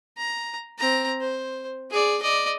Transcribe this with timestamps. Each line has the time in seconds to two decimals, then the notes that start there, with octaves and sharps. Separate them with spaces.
0.18 A#5
0.78 C4 A#5
1.20 C5
1.91 G#4 D5
2.22 D5 D#5